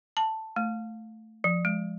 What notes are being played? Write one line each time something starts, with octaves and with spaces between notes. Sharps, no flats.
A5
A3
F3
G#3